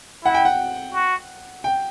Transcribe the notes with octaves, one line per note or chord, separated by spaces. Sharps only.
E4 F#5
G5
F#5
F#4
G5